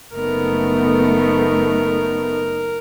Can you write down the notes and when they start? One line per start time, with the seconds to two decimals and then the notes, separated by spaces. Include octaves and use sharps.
0.14 F#1 A3 B3 D#4 A#4